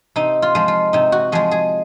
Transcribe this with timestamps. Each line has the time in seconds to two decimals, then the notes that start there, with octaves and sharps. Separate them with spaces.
0.16 C3 D#4
0.42 F4
0.55 F3 G#3
0.68 F4
0.93 C3 D#4
1.12 F#4
1.32 F3 G#3 G#4
1.51 G#4